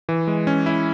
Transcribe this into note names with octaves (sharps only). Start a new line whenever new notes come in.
E3
G#3
C#4
E4